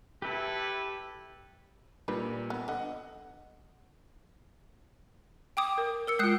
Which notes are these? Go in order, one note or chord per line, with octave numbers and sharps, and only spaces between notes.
E4 G4 A4 B4 E5
A#2 G3 D4 D#4 B4
B3
D3 D#5 F#5
G5 D6 D#6
A#4
A#4 E6 C#7
G#3 F4 D#6 F#6 C7